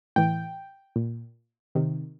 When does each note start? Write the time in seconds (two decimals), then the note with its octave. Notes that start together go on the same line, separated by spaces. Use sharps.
0.16 A2 E3 G5
0.96 A#2
1.75 C3 D#3